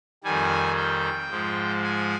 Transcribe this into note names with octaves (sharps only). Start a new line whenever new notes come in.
F2 D#3 G3 G#5
G5
G#2 F3 G#3
G#5